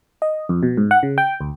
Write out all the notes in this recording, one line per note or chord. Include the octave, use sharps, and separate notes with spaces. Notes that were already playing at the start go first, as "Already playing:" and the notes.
D#5
F2
B2
G#2
F#5
C#3
G5
D2